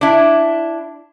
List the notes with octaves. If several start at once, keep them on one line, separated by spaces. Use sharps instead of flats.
D4 E4